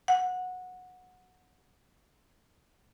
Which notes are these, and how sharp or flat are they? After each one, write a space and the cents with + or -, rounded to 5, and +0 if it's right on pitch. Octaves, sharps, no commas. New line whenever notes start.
F#5 -15